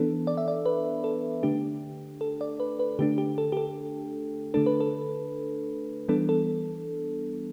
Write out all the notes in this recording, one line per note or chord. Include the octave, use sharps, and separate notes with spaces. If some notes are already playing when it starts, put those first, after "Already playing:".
Already playing: E3 B3 D4 A4
D5
E5
D5
B4
A4
D3 A3 D4 G4
A4
D5
B4
B4
D3 A3 D4 G4
G4
A4
G4
A4
D3 A3 D4 A4
B4
A4
E3 G3 B3 D4 A4
A4